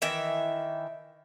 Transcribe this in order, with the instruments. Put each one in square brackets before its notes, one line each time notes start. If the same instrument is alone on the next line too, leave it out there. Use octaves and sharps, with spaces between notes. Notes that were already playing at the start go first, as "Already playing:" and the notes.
[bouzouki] D#3 E3 E5